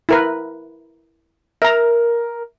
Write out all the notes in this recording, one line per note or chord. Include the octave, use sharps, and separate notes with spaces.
E4 A#4 B4
A#4 E5 A#5